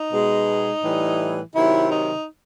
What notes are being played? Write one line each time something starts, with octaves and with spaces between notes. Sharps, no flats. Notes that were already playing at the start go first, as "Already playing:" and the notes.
Already playing: D#4
B2 G#3
A2 E3 G3
C3 D#3 F#3 E4
D#4